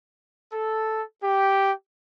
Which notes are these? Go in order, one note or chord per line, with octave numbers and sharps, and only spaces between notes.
A4
G4